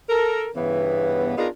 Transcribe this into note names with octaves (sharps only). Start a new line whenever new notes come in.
A4 A#4
G2 C#3 E3 B3
B3 D4 D#4 F4 G#4 A#4